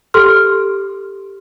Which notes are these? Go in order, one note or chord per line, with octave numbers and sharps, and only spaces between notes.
G4 A4 C6 F6